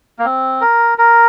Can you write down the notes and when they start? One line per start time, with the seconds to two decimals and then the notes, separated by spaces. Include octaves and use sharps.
0.19 A#3
0.25 C4
0.61 A#4
0.98 A#4